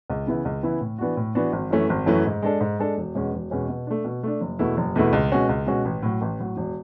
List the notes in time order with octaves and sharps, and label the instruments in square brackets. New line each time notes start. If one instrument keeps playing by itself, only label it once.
[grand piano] C#2
C#3 E3 B3 E4
C#2
C#3 E3 B3 E4
A2
E3 B3 D4 F#4
A2
E3 B3 D4 F#4
G#1
F#2 E3 A3 C#4
G#1
F#2 E3 A3 C#4
G#2
G#3 D4 A4
G#2
G#3 D4 A4
E1
E2 B2 G#3 C#4
E1
E2 B2 G#3 C#4
B2
A3 D4
B2
A3 D4
F#1
E2 B2 A3 E4
F#1
E2 B2 A3 E4
C#2
B2 G#3 C#4 F#4
C#2
B2 G#3 C#4 F#4
A1
A2 F#3
A1
A2 F#3
E1